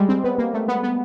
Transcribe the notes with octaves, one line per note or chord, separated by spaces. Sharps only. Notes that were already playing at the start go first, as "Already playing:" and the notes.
Already playing: G3 G#3
C4
B3
A#3
A3
B3
B3